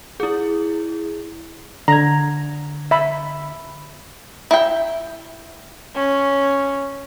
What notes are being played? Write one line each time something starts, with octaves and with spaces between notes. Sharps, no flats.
E4 G#4
D3 A#5 G#6
E5 B5
E4 G5
C#4